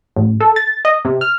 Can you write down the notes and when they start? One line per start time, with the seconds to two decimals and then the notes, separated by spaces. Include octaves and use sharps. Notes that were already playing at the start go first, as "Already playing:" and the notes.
0.16 A1
0.40 A4
0.56 A6
0.85 D#5
1.05 C3
1.21 F6